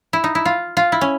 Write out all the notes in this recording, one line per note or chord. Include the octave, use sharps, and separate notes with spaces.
E4
D#4
E4
F4
F4
E4
C#4